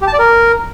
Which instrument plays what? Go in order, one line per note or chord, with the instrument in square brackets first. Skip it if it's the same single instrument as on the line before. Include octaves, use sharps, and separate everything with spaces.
[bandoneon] G4
A5
D5
A#4